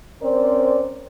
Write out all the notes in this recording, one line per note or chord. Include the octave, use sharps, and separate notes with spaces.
C4 C#4 A#4 C5 D5